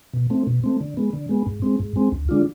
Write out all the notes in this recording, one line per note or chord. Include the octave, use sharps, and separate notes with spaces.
B2
A3 C4
B2
A3 C4
D3
G#3 B3
D3
G#3 B3
G#2
G#3 C4
G#2
G#3 C4
D2
D3 G#3 D4 F4